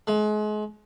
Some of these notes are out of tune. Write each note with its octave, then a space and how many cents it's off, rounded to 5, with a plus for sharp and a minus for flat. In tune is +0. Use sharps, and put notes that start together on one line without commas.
G#3 +35